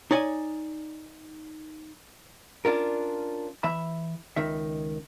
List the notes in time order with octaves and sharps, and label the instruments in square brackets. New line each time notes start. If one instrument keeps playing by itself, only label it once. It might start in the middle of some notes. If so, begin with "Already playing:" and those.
[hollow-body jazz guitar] D#4 C#5 D5 G#5
C#4 D4 F4 A#4
E3 E5 B5
C#2 D#3 E5